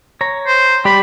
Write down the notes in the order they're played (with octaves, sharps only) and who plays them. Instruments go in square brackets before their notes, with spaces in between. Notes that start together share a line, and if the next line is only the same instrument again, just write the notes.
[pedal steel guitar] C#5 A#5
[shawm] C5
[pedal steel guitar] G3 G4 D5 [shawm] B5